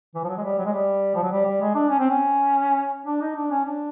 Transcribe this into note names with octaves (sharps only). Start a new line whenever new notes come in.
E3
F3
F#3
G#3
G3
F#3
G#3
G3
F3
F#3
G3
G3
G#3
D4
C#4
C4
C#4
D4
D#4
D4
C#4
D4